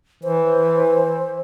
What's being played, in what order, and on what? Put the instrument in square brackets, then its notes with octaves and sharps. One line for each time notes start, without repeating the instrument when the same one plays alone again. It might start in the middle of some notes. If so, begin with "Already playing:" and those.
[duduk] E3 [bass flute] C5